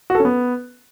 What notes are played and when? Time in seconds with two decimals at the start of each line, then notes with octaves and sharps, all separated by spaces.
0.10 F#4
0.15 A4
0.20 C#4
0.25 B3